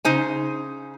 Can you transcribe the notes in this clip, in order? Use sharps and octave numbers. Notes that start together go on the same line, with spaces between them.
C#3 D#4 C5 G#5